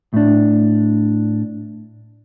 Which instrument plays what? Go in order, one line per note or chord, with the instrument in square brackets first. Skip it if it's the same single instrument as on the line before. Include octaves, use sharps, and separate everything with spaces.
[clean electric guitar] A2 D4